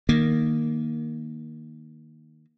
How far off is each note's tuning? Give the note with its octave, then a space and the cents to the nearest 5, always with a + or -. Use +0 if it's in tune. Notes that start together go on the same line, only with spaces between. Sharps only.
D#3 -10 A#3 +0